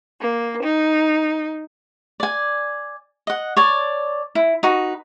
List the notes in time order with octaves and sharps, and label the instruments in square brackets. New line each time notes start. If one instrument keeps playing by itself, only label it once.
[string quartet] A#3
D#4
[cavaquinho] D5 G#5
D#5 F#5
C#5 D5 A5
E4
D#4 F#4 B4